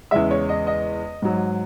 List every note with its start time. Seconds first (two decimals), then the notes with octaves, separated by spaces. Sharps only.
0.11 E2 C#3 G#3 E5
0.31 C#5
0.49 D#5
0.67 D#5
1.22 G#2 F#3